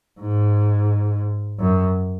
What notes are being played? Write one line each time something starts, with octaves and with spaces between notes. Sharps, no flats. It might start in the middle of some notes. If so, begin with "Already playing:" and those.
G#2
F#2